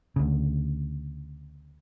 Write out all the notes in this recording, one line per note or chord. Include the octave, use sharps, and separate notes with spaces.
D2 C#3